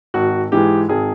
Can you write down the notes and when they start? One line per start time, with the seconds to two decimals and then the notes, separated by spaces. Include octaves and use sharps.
0.14 G#1 F#4
0.52 G#2 E3 G#3 G4
0.89 G#1 G#4